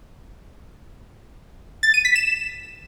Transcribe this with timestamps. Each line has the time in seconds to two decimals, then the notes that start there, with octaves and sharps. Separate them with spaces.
1.83 A6
1.94 D#7
2.05 B6
2.16 E7